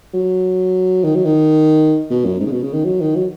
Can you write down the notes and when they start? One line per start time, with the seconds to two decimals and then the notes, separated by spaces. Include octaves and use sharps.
0.14 F#3
1.04 D#3
1.15 F#3
1.25 D#3
2.10 B2
2.25 F#2
2.40 G#2
2.46 C#3
2.51 B2
2.63 C#3
2.73 D#3
2.85 F#3
3.01 D#3
3.16 F#3